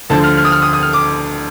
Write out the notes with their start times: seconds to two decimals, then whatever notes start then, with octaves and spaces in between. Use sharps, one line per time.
0.10 D2 D3 F3 A5
0.24 F6
0.37 F6
0.45 D#6
0.52 F6
0.62 D#6
0.73 D#6
0.82 F6
0.93 D6